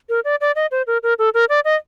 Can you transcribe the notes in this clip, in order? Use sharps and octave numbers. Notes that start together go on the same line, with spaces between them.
A#4
D5
D5
D#5
C5
A#4
A#4
A4
A#4
D5
D#5